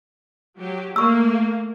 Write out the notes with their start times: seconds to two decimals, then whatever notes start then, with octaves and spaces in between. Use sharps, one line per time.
0.59 F#3 G4
0.96 A3 A#3 C#6 E6